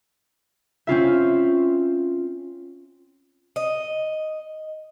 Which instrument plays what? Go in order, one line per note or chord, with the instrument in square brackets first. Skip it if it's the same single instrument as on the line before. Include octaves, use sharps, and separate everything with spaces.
[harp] C4 C#4 F4 E5
[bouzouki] D#5